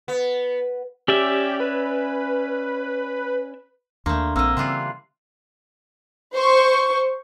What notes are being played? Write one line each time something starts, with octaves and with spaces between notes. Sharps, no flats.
B3
C#4 G4 D5 E5
B4
D#2 A3 A#3 D4 C6
A#1 A#3 C4 D#5 E6
C#3 E3 G3 F4 C6 F#6 C7
C5 C#6